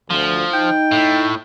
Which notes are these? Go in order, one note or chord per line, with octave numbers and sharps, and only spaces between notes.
D2 F3
D#4 G5
A2